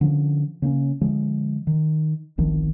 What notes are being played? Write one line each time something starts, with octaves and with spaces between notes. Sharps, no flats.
D3 F3 C#4
C#3 A#3 B3 C#4
D3 F3 G#3
D#3
G1 C2 D#3 F3